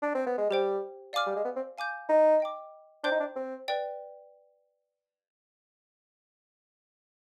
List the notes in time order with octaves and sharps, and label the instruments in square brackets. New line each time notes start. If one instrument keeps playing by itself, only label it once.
[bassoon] D4
C4
B3
G#3
[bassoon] G3 [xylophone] G4 C5 G5
[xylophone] D5 F5 G#5 D6 F6
[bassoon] G3
G#3
B3
C4
[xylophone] F5 G#5 D6 G6
[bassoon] D#4
[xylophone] D#5 G5 D6
[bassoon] D4 [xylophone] C5 G5 C6 G6
[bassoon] D#4
D4
C4
[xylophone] B4 D5 G5